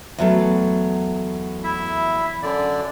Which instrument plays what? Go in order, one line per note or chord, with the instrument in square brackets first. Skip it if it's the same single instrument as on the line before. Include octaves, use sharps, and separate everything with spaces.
[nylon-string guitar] E2 F#3 A3
[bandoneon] E4 E5
F#2 D3 D5